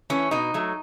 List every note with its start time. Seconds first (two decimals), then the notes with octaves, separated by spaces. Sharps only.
0.10 E3 A3 C#4
0.31 B2 D#4
0.54 F#3 A3